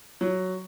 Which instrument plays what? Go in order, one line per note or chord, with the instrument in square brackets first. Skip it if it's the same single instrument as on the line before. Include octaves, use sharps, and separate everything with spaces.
[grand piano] F#3